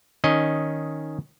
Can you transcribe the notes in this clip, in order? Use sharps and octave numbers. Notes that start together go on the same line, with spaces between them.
D#3 C#4 D#5